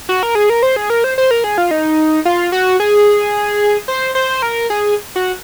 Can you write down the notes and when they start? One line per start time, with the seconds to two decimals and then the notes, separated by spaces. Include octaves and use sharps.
0.09 F#4
0.23 A#4
0.35 G#4
0.50 A#4
0.63 C5
0.76 G#4
0.90 A#4
1.04 C5
1.18 C5
1.31 A#4
1.44 G#4
1.58 F4
1.71 D#4
2.25 F4
2.52 F#4
2.80 G#4
3.88 C5
4.15 C5
4.42 A#4
4.70 G#4
5.16 F#4